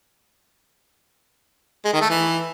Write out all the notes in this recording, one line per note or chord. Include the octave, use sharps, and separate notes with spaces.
G#3
D#3
A3
E3